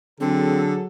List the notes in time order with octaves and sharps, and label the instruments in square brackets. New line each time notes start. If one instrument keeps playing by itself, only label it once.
[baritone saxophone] D3 [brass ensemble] F#3 G#4 A4 [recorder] C4